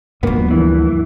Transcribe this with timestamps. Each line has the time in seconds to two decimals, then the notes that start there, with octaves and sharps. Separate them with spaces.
0.23 D2 G2 F3 A#3 B3
0.51 E3